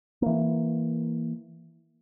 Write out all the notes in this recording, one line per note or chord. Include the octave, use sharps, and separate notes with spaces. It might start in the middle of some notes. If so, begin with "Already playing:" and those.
E3 A#3